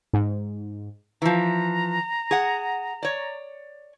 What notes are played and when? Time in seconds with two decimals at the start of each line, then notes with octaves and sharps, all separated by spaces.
0.13 G#2
1.22 E3 F3 A#5
2.31 G#4 F#5
3.03 C#5 D5